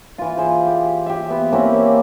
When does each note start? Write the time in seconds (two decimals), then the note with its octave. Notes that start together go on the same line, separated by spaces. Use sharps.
0.18 E3 F4
0.37 G#4 C5
0.66 G4
1.06 G4 E5
1.30 B3
1.53 A#3 C4 C#4 E4